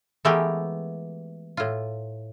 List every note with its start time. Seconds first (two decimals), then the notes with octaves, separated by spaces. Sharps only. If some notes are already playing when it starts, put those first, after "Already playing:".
0.25 E3 G#3 A3 B3 G4 A#4
1.57 A2 F4